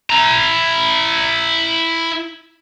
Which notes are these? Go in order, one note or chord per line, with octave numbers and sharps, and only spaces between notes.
E4 A#5